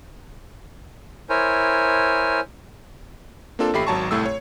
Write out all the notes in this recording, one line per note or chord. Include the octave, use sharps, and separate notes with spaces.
E4 A#4 C5 C#5 G#5
A#3 C4 D4 F4 A4
A1 A3 G4 E5 B5 C7
G#1 F#3 C#5 A5 A#5 C#6
C2 A2 A3 E6
C#5